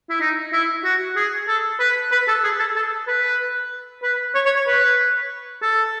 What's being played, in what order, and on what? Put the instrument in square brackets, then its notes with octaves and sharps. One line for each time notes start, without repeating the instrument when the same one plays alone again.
[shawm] E4
D#4
E4
F#4
G#4
A4
B4
B4
A4
G#4
A4
A4
B4
B4
C#5
C#5
C#5
B4
A4